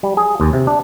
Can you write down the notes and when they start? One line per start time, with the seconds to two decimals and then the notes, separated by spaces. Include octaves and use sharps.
0.03 G3
0.17 G#4
0.40 D#2
0.53 C3
0.67 D4